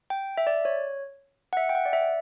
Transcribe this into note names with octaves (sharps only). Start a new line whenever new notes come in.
G5
E5
D5
C#5
F#5
E5
G5
F#5
D5
E5